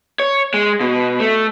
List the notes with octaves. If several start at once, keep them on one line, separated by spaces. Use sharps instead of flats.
C#5
G#3
B2
A3